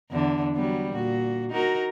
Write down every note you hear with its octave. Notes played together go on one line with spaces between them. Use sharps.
E2 D3
F#3 G3 B3
A#2 F#4
D#4 F#4 A#4